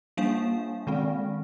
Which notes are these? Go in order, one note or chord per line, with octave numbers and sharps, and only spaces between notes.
G3 A#3 D4 F5
D#3 G#3 C4